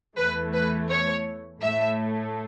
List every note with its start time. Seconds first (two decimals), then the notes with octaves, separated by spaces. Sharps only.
0.17 E2 E3 A3 B4
0.54 B4
0.89 C#5
1.62 A2 A3 E5